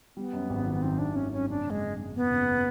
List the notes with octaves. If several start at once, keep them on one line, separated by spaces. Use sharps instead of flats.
G3 B3
F#2
G#1
D#3
D#3 C4
G#1 D4
G#1 C#4
F#2 C#4
F#1 D4
C#3
G#3
C#3
C#3
E2 B3
F#1